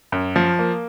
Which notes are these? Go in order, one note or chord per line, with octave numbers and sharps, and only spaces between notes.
F#2
F3
A#3